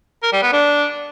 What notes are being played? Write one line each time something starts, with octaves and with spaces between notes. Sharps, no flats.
A#4
G3
B3
D4